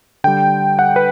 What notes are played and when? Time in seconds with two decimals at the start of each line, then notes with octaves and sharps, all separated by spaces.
0.24 D3 G3 G5
0.79 F#5
0.96 B4